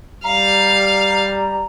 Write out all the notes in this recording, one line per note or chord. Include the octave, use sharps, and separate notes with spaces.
G3 F5 A#5